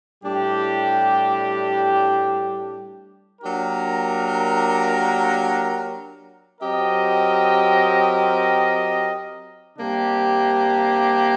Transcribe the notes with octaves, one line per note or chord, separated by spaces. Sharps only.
A2 G3 D4 G4
F#3 A#3 D4 G4 A#4
F#3 C4 G4 A#4 D#5
C3 G3 A#3 D4 G4